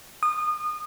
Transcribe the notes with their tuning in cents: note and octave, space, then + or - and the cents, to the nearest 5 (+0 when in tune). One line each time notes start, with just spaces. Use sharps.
D#6 -30